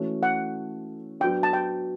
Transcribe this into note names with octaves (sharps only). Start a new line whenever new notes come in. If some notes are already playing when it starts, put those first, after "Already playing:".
Already playing: E3 A3 C#4 F#4 C#5
F#5
F#3 B3 D4 G5
A5
G5